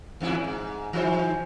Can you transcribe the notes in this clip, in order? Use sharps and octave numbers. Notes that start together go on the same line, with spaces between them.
E2 G#2 E4
G#2
E3 D#4 C5